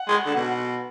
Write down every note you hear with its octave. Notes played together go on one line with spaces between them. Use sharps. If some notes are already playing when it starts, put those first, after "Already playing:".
Already playing: F#5
G#3
D3
B2